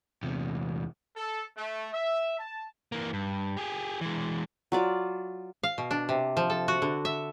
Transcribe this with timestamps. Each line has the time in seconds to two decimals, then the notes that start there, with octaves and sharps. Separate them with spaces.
0.23 E2 C3
1.17 A4
1.57 A3
1.93 E5
2.39 A5
2.92 E3 A#3
3.13 G2
3.57 G4 G#4
4.01 E3 G#3
4.72 F#3 F4 D5
5.63 F5
5.78 B2
5.91 D4
6.09 C3
6.37 F3
6.50 A4
6.68 F#4
6.82 D3
7.05 E5